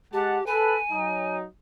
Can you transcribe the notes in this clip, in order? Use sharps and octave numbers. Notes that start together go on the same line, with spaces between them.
G#3 G4 F#5 A5
A4 B4 G#5
F#3 D#4